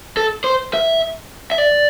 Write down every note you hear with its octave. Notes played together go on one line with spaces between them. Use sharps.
A4
C5
E5
E5
D5